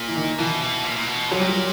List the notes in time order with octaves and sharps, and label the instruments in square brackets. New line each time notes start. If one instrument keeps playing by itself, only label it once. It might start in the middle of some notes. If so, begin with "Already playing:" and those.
Already playing: [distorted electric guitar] A#2
[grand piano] E3
D#3
[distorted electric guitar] B2 [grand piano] E3
[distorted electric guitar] B2
A#2
A#2
B2
[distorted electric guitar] A#2 [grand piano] F#3
[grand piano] G3
F#3